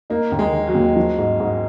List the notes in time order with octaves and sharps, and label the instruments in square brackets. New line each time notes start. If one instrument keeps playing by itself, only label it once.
[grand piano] A#3 [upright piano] D#4
[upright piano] D#2
[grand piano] G#3
[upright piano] D#3
[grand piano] F#3
[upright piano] D#2
F3
G#2
G#2